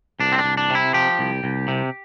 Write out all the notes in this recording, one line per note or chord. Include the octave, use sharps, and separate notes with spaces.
C2 D4
C4
D4
C2
D4
C3 E4
F3 G4
C2
C2
C3